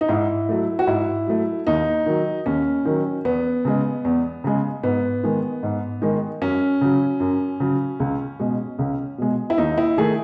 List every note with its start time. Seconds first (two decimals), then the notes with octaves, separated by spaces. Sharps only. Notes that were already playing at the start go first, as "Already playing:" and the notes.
0.01 D#4
0.09 G#2 E4
0.49 F#3 A3
0.79 F#4
0.87 G#2 E4
1.27 F#3 A3
1.67 D#2 D#4
2.06 D#3 F#3
2.46 D#2 C#4
2.85 D#3 F#3
3.25 E2 B3
3.65 C#3 G#3
4.05 E2
4.44 C#3 G#3
4.83 G#2 B3
5.23 D#3 G#3
5.63 G#2
6.02 D#3 G#3
6.41 F#2 C#4
6.81 C#3 F#3
7.20 F#2
7.60 C#3 F#3
8.00 C#2
8.40 B2 G#3
8.79 C#2
9.18 B2 G#3
9.50 E4
9.58 D#2 D#4
9.78 E4
9.97 D#3 A3 G#4